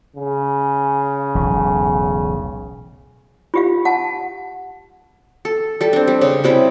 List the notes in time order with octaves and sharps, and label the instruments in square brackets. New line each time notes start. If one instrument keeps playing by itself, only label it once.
[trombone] C#3
[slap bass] E1 B1 A2
[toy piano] F4 G4 F5
F#5 A5
[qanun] A4
G3 A4
C4 D4
G3
C#3 C#4
C3 G3 E4 C5